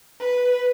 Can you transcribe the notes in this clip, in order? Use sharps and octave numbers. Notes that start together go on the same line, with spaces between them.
B4